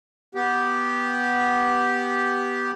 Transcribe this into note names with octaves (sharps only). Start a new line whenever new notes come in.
B3 G4